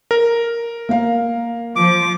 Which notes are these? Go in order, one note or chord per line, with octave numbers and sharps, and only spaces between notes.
A#4
A#3 F5
F3 D6